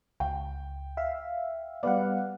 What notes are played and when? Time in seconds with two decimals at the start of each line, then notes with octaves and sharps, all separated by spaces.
0.20 C#2 G5
0.97 E5 F5
1.83 G3 B3 D5 F5 F#5